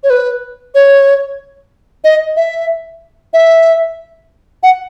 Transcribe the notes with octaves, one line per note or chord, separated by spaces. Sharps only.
C#5
B4
C#5
D#5
E5
E5
F#5